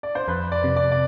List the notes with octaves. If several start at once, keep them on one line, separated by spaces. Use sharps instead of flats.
D5
C5
F2 B4
D5
C3
D5
D5